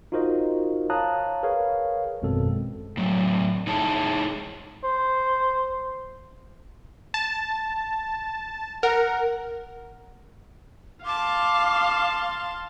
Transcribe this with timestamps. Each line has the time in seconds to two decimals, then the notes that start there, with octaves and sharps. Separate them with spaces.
0.12 D#4 F4 F#4 A#4 C5 D#5
0.90 C#5 F5 A5 A#5 D#6 F#6
1.43 G#4 A#4 B4 C#5 F5
2.22 G#1 F#2 B2 G#3 C4 A4
2.97 A2 F#3
3.67 D#4 E4 G#4 C#5 A5
4.84 C5
7.14 A5
8.83 A#4 F#5
11.05 F5 A5 C6 D6